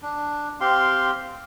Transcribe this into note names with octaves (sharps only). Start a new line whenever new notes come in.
D4
C4 G4 F5 C6